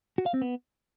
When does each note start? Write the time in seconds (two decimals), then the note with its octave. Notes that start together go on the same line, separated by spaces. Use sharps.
0.18 F#4
0.26 F5
0.34 C4
0.42 B3